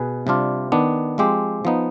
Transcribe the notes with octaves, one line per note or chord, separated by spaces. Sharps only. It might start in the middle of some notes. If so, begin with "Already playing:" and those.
Already playing: B2 G#4 B4
C3 G3 D4 F4
D#3 B3 D4
F3 G#3 C4 G4
F3 B3 D#4